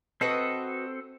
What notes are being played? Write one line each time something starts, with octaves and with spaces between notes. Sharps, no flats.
C4 F#4 A4 B4 D#5